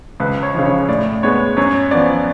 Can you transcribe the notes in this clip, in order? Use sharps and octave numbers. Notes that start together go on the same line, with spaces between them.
C#2 B4
C#5
C#3 F3
C#5
A2 D5
G#3 B3 C#5
F#2 C#5
F3 B3 D5